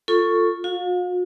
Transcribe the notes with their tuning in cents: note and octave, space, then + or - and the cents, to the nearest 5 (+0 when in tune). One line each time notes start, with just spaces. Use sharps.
F4 +5 A4 +15 C#6 +0
F#4 -45 F5 +35